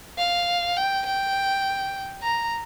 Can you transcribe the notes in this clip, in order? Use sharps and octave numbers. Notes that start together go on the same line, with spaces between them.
F5
G5
G5
A#5